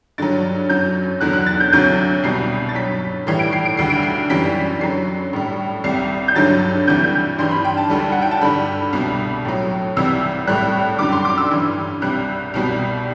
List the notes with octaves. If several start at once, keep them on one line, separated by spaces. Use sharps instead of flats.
G2 D3 F#3 A6
F#2 F#3 G6
E2 D3 F#3 F#6
F#6
A6
G6
D2 C3 F#3 G6
C2 B2 G3 C7
A6
G2 F#3 B6
A2 E3 G3 C7
D7
C7
D7
D2 D3 G3 C7
D7
C7
F#2 E3 G3 B6
F#2 D3 F#3 C7
A2 G3
C2 C3 G3 C7
G6
G2 D3 F#3 A6
D2 C3 E3 G3 G6
G6
G2 E3 G3 C6
B5
G5
A5
D2 D3 G3
F#5
G5
A5
G2 D3 G3 B5
C2 B2 G3
A2 F#3
C2 C3 E3 G3 E6
A2 G3 F#6
F#2 D3 G3 D6
C6
D6
E6
G2 E3 G3
C2 C3 G3 F#6
C2 B2 G3